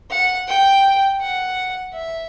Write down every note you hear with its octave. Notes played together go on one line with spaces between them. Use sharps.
F#5
G5
F#5
E5